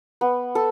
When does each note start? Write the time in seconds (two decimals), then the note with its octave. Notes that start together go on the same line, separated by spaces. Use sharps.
0.21 B3
0.55 A4